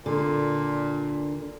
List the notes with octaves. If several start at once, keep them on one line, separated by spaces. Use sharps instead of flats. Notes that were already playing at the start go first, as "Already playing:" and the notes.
A#2 D3